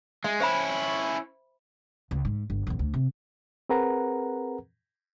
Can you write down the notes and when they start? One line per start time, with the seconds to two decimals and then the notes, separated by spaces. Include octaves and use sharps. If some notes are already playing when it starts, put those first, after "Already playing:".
0.24 G#3 E5
0.40 C#4 E4 C5 E5 B5
2.11 C#2
2.25 G#2
2.50 G1
2.67 A#1 E2
2.79 D2
2.94 C3
3.69 C4 G#4 A#4 B4 F#5 A#5